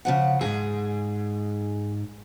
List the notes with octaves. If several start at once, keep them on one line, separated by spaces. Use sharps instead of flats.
C#3 F3 F#5
E2 G#2 G#4